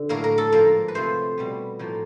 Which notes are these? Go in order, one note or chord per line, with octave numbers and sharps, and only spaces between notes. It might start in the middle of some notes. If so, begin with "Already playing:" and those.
Already playing: D3
A2 F#3 A#3 A#4
A#4
A4
G#2 F3 A#3 A#4
B4
C3 F3 A3 C5
B2 G3 B3
A2 F3 A#3